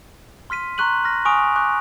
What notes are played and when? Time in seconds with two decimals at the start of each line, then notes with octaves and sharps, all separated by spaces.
0.50 C6 F6 B6 D#7
0.78 A#5 C6 C#6 F#6 D#7 F#7
1.05 F6 A#6
1.25 G#5 C#6 D#6 F6 D7 F7
1.56 C#6 D6 F#6